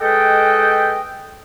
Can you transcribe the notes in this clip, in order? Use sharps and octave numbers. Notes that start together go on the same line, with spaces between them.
G#3 A4 B4 D#5 G5